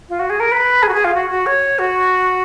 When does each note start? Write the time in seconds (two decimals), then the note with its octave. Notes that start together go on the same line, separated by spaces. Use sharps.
0.09 F4
0.19 F#4
0.30 G#4
0.40 A#4
0.51 B4
0.82 G#4
0.88 F#4
0.94 G#4
1.04 F4
1.14 F#4
1.30 F#4
1.46 C#5
1.79 F#4